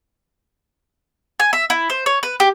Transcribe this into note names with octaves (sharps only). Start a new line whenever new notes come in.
G#5
E5
E4
C5
C#5
B4
G4